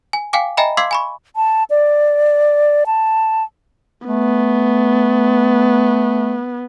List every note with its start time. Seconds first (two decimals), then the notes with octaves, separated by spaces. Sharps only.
0.13 G#5
0.33 F5 G5 G#5 D6
0.57 D#5 E5 G5 G#5 A#5 B5
0.77 F5 C6 D6 E6 G#6 C7
0.91 G#5 B5 C#6
1.36 A5
1.70 D5
2.86 A5
4.07 A3 B3